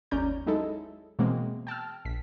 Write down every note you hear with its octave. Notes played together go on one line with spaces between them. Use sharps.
G1 D#2 C#4 D5 A#5 G6
F#3 G#3 D#4 E4 A4
B2 E3 G#3 A#3 C4
G5 A5 E6 F6
A#1 B6